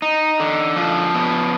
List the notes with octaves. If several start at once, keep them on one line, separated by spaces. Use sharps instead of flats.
D#4
D3
F3
B3